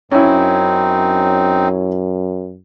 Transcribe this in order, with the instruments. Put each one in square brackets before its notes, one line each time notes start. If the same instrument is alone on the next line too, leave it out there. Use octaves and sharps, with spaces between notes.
[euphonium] F#2 [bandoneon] C4 D#4 [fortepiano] C#4 E4